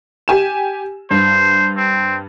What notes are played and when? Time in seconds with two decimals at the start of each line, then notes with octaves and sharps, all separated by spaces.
0.28 G4 G#5 E7
1.11 G2 C5
1.77 C4